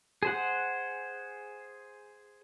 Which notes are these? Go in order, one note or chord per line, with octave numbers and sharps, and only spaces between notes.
G#4 C5 F#5